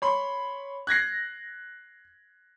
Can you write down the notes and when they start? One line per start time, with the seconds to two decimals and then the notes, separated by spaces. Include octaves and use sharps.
0.02 C#5 B5 C6
0.87 F#6 G#6 A#6 C7